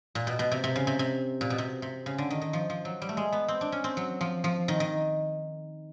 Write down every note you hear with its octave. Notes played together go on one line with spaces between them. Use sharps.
A#2
B2
B2
C3
C3
C#3
C3
C3
A#2
B2
C3
C3
C#3
D3
D#3
D#3
F3
F3
F#3
G3
A3
G#3
B3
C4
D4
C#4
C4
F#3
F3
F3
D#3
D#3